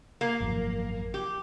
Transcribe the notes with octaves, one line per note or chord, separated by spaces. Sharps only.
A#3
G#1 F#2 F3
G4